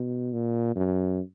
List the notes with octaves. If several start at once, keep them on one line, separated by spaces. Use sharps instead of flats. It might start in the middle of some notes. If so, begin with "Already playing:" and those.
Already playing: B2
A#2
F#2